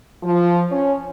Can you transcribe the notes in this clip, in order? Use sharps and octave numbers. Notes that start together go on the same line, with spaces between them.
F3
C#4